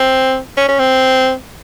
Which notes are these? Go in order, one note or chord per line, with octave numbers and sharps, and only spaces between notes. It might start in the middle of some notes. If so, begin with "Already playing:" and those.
Already playing: C4
C#4
C#4
C4